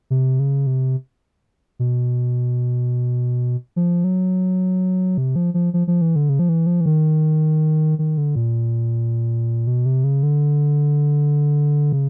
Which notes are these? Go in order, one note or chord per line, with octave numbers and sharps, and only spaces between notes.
C3
C#3
C3
B2
F3
F#3
C3
F3
F3
F3
F3
E3
D3
C#3
F3
E3
F3
E3
D#3
D#3
D3
A#2
B2
C3
C#3
D3
C#3